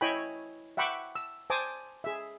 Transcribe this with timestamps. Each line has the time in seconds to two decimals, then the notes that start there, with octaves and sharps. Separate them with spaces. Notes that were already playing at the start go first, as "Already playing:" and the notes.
0.01 E4 C#5 D#5 G5 G#5 B5
0.77 E5 F#5 G5 B5 C#6 D6
1.15 E6
1.50 C5 G#5 A5 D6 D#6
2.04 G#4 E5